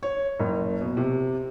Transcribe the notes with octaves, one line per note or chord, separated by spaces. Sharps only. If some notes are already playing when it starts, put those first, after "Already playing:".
C#5
F#1
B2
C3